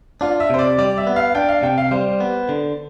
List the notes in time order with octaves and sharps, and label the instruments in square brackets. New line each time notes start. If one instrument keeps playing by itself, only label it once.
[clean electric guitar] D4 [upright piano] F4
[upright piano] E5
[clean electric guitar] C3 [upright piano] C5
[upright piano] D5
[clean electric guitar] G3 [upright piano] D5
[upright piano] E5
[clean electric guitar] B3
[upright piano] F5
[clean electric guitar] D4 [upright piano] G5
[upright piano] F5
[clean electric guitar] C3 [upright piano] G5
[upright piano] F5
[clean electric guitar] G3 [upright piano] C5
[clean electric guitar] B3
D3